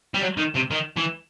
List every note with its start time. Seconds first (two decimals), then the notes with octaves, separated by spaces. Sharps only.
0.14 G3
0.22 F#3
0.38 D#3
0.55 C3
0.71 D#3
0.97 E3